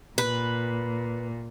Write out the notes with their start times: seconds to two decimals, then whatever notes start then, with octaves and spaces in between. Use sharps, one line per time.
0.18 A#2 B4